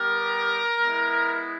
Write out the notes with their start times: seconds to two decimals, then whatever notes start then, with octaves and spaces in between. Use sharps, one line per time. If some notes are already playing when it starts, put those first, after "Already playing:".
Already playing: G3 B3 G4 A#4
0.80 G#3 B3 E4